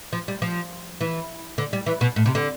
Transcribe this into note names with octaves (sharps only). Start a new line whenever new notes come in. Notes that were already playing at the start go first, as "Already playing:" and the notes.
F3
G3
F3
E3
D3
G3
E3
B2
A2
C3
D3